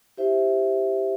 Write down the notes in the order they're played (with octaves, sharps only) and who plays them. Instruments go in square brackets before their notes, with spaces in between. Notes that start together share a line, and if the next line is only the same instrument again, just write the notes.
[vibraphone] E4 G4 C5 E5